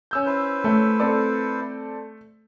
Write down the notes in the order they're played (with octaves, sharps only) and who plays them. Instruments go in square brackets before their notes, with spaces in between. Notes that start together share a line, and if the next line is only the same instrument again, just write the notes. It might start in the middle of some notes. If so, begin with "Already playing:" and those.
[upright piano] C#4 E6 G6
[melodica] E4 B4 C5
[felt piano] A3
[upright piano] C4 A4 D5